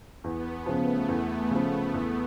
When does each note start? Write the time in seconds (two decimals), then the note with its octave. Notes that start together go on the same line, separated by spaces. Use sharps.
0.24 E2 B3
0.52 B3
0.66 C#3 F3
0.81 A3
1.09 E2
1.51 C#3 F3
1.94 E2